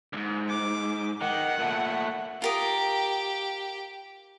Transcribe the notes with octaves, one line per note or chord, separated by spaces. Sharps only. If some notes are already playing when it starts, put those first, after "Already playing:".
D2 G#2
D6
D#3 F#5
A#2 A3
F4 G4 A#4 D#6